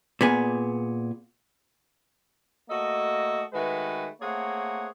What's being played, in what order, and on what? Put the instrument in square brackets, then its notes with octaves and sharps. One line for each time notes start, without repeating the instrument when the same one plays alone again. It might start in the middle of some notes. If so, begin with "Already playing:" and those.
[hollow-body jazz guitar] A#2 B3 G#4
[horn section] A3 A#3 F#4 A4 D#5
D#3 G#3 A3 F#4 B4
A3 A#3 C4 G#4 C#5 F#5